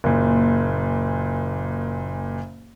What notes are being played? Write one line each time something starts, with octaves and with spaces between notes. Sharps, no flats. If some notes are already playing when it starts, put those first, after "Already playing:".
F#1 A#2